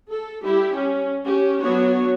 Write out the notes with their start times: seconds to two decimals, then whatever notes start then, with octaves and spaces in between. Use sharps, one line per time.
0.10 A4
0.43 G3 E4 G4
0.75 C#4
1.25 C#4 G4
1.61 F#3 B3 D4 F#4 C#5